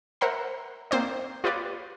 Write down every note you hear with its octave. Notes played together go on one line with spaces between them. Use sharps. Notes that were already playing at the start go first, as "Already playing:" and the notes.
A#4 C5 E5 F#5 A#5 B5
A#3 C4 C5 D5
F4 G4 B4 C#5 D5